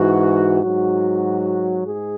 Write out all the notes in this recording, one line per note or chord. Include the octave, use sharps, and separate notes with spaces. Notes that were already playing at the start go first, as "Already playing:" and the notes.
Already playing: G#2 E3 F#4
G#2 F#3 F#4
G#2 G#4